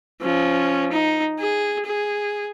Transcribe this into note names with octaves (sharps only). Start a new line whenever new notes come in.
F3 C#4
D#4
G#4
G#4